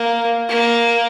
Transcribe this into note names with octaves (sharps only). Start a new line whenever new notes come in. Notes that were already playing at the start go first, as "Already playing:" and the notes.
Already playing: A#3
A#3